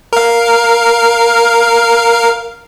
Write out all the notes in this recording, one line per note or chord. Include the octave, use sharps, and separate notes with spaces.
A#4 F5